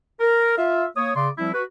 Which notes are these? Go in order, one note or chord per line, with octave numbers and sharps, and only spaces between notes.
A#4
F4 E5 F5
A#3 C#5 D#6
C#3 D5 C6
F3 G3 C4 E4
F#4 B4